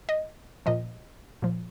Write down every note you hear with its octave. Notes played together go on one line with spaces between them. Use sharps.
D#5
A#2 F3 D#5
A#2 F3